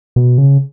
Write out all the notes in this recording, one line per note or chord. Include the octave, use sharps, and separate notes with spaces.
B2
C#3